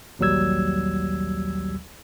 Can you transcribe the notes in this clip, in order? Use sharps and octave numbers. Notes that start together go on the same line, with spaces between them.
A#1 D#2 F#3 G3 E6 G#6